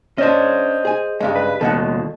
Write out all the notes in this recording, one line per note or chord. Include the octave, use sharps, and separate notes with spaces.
C#4 D4 C5 D#5
G#4 G#5
G2 C#3 G#3
B4
D#2 B2 A4 D#5 F#5